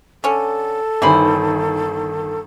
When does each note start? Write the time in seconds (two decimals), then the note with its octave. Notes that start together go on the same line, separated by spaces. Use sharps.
0.24 D3 C#4 A4
1.02 G1 D#3 E3 G#3 C5 E5 B5